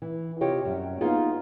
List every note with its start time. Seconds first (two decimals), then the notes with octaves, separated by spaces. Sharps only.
0.02 E3
0.41 C3 F4 G4 C#5 D#5
0.65 F#2 G3
1.01 A#3 B3 D#4 F4 G#4